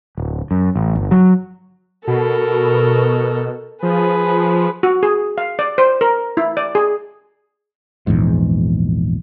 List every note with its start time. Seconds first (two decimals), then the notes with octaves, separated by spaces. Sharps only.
0.17 D1
0.51 F#2
0.76 A1
0.95 G1
1.11 F#3
2.07 B2 A4 A#4
3.83 F3 G#4 B4
4.83 F#4
5.03 G#4
5.38 F5
5.59 D5
5.78 C5
6.01 A#4
6.37 E4
6.57 D5
6.75 G#4
8.07 A#1 E2 G#2